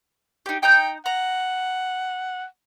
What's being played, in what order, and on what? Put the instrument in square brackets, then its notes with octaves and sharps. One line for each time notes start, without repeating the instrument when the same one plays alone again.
[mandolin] D#4 G4
[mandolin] D#4 A#5 G6 [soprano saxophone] G5
[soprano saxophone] F#5 [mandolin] A#5